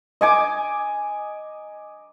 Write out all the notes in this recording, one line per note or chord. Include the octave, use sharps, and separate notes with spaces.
D#5 G#5 D6